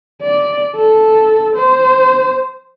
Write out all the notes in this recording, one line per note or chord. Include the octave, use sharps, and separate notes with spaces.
D5
A4
C5